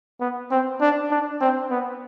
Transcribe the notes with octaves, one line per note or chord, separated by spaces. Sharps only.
B3
C4
D4
D4
C4
B3